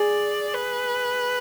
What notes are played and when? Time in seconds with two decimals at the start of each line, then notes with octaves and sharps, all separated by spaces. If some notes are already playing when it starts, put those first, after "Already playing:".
Already playing: G#4 D5
0.54 B4